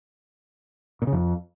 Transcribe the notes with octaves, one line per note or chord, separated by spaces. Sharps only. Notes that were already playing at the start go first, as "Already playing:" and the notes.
A#2
C#3
F2